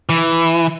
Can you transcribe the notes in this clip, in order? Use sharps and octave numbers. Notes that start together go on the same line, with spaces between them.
E3